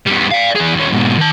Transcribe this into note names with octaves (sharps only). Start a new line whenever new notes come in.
E2 G3
D5 F5
E3 G#4
D#2 C#4
G#2 B2
D#3 A5